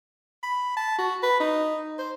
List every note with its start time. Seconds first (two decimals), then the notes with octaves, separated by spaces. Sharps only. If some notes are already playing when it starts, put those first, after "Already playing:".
0.43 B5
0.77 A5
0.99 F#4
1.23 B4
1.40 D#4
1.98 C5